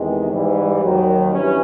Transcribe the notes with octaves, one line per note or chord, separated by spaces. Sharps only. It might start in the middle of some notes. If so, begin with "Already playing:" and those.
Already playing: E2 C3 D#3 G#3
G#2 E3 G3
D#2 D#3 F#3
G2 E3 C#4